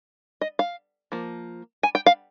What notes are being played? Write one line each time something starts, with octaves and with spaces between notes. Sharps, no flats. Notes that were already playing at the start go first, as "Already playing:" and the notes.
D#5
F5
F3 A#3
G#5
G5
F5